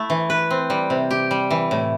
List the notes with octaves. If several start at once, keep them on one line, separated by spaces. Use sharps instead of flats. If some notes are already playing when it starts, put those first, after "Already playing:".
Already playing: A3 E4
E3
B4
C4
G3
C3
G4
G3
E3
A2